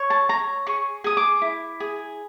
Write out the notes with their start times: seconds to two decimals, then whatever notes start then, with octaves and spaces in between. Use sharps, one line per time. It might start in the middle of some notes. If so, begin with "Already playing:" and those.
Already playing: C#5
0.10 A5
0.29 C#5 A#5
0.67 G#4 C#6
1.04 G#4 D#6
1.17 D6
1.42 E4
1.80 G#4